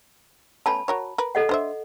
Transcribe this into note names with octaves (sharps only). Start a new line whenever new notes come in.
A3 B3 C#4 A5 B5
F#4 A#4 C#5
A#4 B4
A4 D#5 F#5
D4 C5 E5